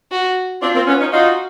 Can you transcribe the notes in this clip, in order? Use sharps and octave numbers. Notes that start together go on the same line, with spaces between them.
F#4
C4 D4 F4
A#3 C4
B3 C#4
C#4 D#4
D#4 F4 F#4